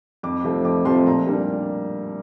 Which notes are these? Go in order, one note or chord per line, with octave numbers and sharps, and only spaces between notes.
F2 D6
C3 F3 A3 C4
F2 D6
C3 F3 A3 C4 C6
A#2 A#5
G3 A#3 D4